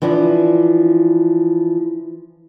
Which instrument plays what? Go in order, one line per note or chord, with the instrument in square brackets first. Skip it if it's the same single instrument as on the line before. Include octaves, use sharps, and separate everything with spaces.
[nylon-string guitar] E3 F3 D4 E4